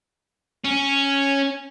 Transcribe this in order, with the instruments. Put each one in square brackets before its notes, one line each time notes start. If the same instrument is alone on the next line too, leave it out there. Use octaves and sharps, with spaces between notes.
[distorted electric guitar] C#4